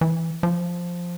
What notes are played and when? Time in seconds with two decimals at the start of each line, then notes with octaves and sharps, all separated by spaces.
0.01 E3
0.43 F3